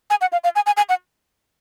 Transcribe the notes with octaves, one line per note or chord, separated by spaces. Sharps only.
G#5
F#5
F5
F5
G#5
G#5
G#5
F#5